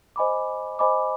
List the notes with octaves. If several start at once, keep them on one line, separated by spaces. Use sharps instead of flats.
C5 D#5 G#5 B5 D6
C5 D#5 G#5 B5 D6